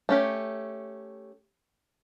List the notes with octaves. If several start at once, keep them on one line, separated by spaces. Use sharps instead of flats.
A3 C#4 G4